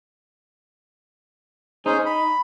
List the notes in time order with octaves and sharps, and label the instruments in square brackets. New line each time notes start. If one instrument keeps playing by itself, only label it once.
[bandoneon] C#4 G#4 C5 [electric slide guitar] D#4
[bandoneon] B5